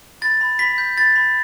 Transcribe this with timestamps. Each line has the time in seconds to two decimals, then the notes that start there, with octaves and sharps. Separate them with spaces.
0.22 B5 A6
0.41 B5
0.59 B5 B6
0.78 G6
0.97 B5 A6
1.16 B5